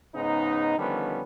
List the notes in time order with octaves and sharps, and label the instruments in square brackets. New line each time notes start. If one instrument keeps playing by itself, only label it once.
[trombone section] G#2 C#3 B3 D#4
D3 D#3 F3 G3 B3 C#4